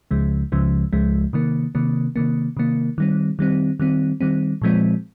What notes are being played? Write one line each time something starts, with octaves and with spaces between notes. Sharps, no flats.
C#2 C#3 F3 G#3
C#2 C#3 F3 G#3
C#2 C#3 F3 G#3
C3 D#3 A#3
C3 D#3 A#3
C3 D#3 A#3
C3 D#3 A#3
D#3 G3 C4
D#3 G3 C4
D#3 G3 C4
D#3 G3 C4
A#2 F3 G#3 C4